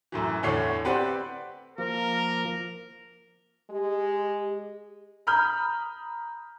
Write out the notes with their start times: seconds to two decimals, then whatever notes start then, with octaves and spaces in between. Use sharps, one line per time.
0.12 F#2 A2 E3
0.43 E2 A2 D3 A3 C#5 C7
0.85 C4 G4 B4 D5 F#5 C6
1.78 F3 A#3 A#4
3.70 G#3 G4
5.27 A#5 B5 D#6 F6 G6